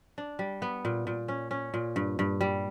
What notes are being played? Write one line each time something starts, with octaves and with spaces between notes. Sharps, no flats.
D4
G3
B3
A#2
A#2
C#4
C#4
A#2
G2
G2
G3